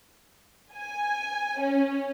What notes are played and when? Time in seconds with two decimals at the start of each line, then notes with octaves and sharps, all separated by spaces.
0.74 G#5
1.60 C#4